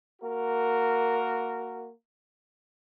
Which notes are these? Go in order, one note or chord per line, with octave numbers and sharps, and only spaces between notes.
A#3 F#4 A#4